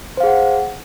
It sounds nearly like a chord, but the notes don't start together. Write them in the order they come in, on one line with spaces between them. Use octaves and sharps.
C5 F5 G#4 F#5